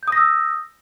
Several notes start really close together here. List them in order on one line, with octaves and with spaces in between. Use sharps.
G6 D#6 A#6 E6